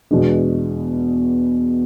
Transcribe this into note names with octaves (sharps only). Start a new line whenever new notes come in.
E2 B2 G#3 D4